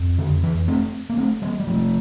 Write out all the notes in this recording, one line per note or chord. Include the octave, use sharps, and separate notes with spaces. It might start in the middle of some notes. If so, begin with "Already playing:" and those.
Already playing: F2
D3
E3
A3 C4
A#3
A3 C4
G3 A#3
G3
F3 A3